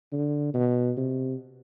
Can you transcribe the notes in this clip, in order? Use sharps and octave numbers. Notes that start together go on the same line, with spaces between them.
D3
B2
C3